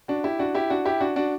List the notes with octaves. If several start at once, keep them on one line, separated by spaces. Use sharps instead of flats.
D4 F#4
E4 G4
D4 F#4
E4 G4
D4 F#4
E4 G4
D4 F#4
D4 F#4